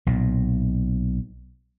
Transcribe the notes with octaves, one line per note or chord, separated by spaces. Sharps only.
B1 A#2